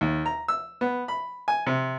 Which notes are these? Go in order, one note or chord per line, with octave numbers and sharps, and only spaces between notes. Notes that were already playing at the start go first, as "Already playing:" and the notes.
D#2
A#5
E6
B3
B5
G#5
C3